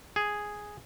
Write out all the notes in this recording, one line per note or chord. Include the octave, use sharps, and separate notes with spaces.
G#4